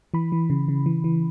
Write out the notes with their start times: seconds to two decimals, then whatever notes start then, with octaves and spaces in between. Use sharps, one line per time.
0.14 E3 B5
0.32 E3
0.50 C#3
0.68 C#3
0.86 E3
1.04 E3